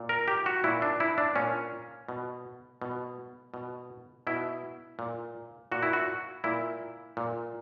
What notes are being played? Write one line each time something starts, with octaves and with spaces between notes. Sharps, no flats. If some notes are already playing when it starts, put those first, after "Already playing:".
Already playing: A#2
A#4
G4
F#4
A#2 E4
D4
E4
D4
A#2 C#4
B2
B2
B2
B2 E4
A#2
A#2 F#4
E4
F#4
A#2 E4
A#2